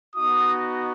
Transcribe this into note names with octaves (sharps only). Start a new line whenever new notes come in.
B3 D#4 F#4 D#6